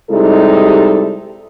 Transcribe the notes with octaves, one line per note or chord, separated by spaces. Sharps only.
C3 G3 G#3 D#4 E4 A4